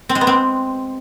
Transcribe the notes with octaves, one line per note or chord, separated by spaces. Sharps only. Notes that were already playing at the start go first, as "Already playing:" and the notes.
C4
G#3
B3
C4